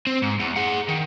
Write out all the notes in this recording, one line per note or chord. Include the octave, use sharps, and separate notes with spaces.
C4
G#2
E2
G#4 F#5
D#3